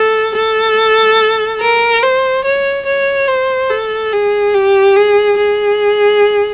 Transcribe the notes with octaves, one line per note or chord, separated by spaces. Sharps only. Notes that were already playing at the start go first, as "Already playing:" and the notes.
Already playing: A4
A4
A#4
C5
C#5
C#5
C5
A4
G#4
G4
G#4
G#4